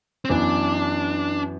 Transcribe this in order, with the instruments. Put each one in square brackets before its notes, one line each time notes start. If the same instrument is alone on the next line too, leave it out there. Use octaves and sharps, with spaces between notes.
[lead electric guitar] C4
[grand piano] F#2 E3 B3 [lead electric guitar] D4